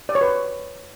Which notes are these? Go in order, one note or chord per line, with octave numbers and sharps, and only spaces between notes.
D5
C#5
B4